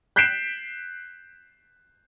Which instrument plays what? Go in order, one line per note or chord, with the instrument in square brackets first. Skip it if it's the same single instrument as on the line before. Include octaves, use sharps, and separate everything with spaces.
[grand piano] F#6 G6 B6 C7 D7 E7